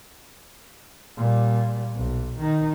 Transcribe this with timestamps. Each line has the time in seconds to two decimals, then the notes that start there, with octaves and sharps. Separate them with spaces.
1.17 A#2 G3
1.96 B1
2.39 D#3 D#4